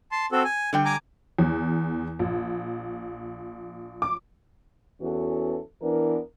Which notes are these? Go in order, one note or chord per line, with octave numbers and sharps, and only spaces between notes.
A5 C6
C4 F#4 A4
G#5
D3 G3 G5
G#5 A#5 D6
E2
A#1
D6
E2 E3 B3 C#4 F#4 A4
E3 B3 D4 A#4